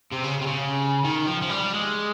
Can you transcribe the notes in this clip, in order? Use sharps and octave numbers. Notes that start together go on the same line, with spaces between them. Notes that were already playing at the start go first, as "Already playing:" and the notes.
C3
C#3
C3
C#3
D#3
F3
F3
G3
G#3